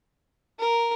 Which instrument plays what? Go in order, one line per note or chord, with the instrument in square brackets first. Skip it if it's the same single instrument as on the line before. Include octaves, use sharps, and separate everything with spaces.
[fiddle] A#4